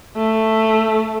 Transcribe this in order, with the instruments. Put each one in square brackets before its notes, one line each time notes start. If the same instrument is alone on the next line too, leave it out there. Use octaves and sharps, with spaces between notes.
[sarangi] A3